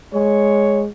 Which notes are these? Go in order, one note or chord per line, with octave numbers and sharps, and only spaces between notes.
G#3 C#5